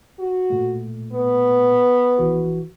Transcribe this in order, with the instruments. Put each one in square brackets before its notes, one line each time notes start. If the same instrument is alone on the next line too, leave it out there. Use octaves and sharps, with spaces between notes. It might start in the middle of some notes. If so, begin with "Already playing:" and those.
[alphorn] F#4
[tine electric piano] A#2 A3
[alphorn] B3
[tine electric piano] A#1 E3 F#4